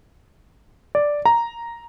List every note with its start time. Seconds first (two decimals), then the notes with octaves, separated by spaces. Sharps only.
0.95 D5
1.25 A#5